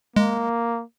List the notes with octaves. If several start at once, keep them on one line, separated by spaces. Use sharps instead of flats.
G#3 A#3